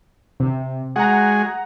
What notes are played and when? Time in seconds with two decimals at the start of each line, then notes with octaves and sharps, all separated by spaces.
0.40 C3
0.96 G#3 F#4 G#4 F#5 A#5